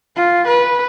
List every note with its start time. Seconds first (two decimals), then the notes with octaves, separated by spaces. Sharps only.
0.16 F4
0.47 B4